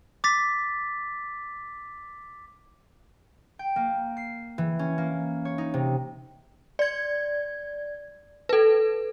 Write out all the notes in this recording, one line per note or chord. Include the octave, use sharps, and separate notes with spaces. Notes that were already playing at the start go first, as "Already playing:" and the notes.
D6 A6 B6
G5
A#3
C7
E3
C#4
A#3
C#5
D#4
C3
D5 G#6
A4 B4